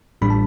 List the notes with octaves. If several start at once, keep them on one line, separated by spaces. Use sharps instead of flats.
A1 A2 G3 D4 B5
A5